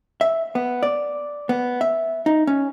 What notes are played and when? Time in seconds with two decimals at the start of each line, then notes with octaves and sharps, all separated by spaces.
0.21 E5
0.55 B3
0.83 D5
1.49 B3
1.81 E5
2.26 D#4
2.47 C#4